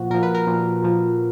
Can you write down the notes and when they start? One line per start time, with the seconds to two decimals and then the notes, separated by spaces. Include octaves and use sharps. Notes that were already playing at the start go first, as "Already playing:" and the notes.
Already playing: A#2 F3 F#4
0.10 A#2 A#4
0.14 F3
0.23 B4
0.35 A#4
0.47 A#2 F3
0.83 A#2 F3